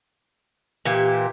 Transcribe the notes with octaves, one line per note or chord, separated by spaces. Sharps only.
A#2 E3 G4